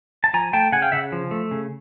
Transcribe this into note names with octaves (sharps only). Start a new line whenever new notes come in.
A5
F3 G#5 A#5
A3 G5 A5
C#3 F#5 G#5
F5 G5
C#3 E5 F#5
F3
A3
C#3